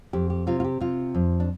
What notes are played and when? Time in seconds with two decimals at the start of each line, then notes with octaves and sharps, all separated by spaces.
0.13 F2 G4
0.30 G4
0.47 C3 F4
0.60 F4
0.64 G4
0.80 C3 F4
1.15 F2
1.40 D4